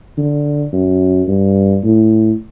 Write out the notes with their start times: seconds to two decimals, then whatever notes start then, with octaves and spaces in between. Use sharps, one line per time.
0.18 D3
0.73 F#2
1.28 G2
1.84 A2